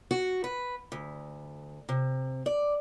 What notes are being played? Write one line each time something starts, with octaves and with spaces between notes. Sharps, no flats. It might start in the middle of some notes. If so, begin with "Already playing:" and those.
F#4
B4
D2
C3
D5